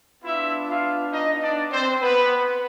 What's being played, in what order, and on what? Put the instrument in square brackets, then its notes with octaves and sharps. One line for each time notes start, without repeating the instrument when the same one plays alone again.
[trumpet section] B3 D4 E4 F4 E5
F4 F5
D#4 D#5
D4 D5
C4 C5
B3 B4